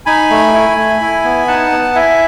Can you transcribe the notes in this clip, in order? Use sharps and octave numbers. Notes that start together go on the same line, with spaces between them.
D#4 G#5 B5
A3
E4
A3
E4
B3
D#4 F#5 A5
B3
E4 E5 G#5